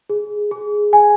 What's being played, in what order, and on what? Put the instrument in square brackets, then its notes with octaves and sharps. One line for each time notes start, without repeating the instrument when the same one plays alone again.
[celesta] G#4
G#4
G#5